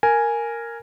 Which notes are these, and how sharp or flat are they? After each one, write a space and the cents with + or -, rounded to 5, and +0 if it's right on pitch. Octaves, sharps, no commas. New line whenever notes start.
A#4 -5 G#5 +0